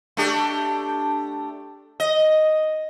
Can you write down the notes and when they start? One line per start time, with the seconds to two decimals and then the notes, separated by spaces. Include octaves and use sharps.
0.17 A3 D4 G4
2.00 D#5